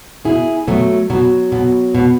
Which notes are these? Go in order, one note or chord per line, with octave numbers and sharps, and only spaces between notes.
B2 E4 G#4
B2 F#3 A3
B2 F#3
B2
B2